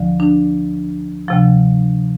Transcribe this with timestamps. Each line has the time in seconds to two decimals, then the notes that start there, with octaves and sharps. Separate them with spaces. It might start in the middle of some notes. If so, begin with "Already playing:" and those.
Already playing: D2 D3 F3
0.20 D4
1.28 D2 C3 F3